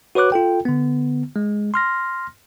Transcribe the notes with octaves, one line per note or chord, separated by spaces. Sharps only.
F#4 B4 C#5 D6 F#6
F4 A4 G5
D3 B3
G#3
C6 F6 A#6